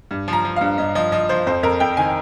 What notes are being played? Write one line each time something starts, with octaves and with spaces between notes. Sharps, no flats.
G2
F3
A#5
F3
G2 F5
G2 D#5
F3 D#5
F3 D#5
F3 C5
F2 C5
F2 A#4
F2 G5
D#3 G#5